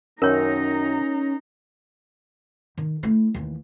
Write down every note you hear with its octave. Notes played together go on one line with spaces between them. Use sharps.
F#2 D#3 C#4 D#4 A#4 C#5 A#5
D#3
A3 E4
D#2 E3